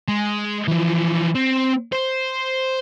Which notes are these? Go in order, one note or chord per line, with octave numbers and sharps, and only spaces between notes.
G#3
E3 F3
C4
C5